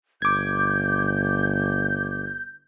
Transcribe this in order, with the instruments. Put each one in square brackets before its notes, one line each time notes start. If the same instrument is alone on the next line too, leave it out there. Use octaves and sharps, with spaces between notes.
[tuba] G1 [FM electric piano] D6 G#6 [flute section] G6